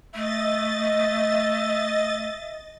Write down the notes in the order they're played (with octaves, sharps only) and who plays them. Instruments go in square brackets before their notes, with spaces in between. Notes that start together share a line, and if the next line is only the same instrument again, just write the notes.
[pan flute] A3 [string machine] D#5 A6 [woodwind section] E5